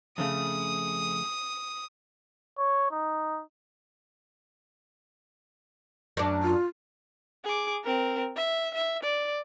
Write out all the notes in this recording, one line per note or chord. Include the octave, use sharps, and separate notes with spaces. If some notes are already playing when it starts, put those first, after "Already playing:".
F2 C#3 A3 D#6
C#5
D#4
F#2 D4
F4
G#4 D6
C4 A#4
E5
E5
D5